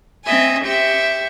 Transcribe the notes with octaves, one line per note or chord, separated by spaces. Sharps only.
C4 D#5 E5 G#5
G4 C5 E5 C#6